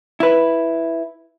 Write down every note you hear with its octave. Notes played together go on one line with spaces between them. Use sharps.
E4 B4